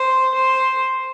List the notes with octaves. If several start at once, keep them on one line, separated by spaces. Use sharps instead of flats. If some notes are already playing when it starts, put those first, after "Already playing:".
Already playing: C5
C5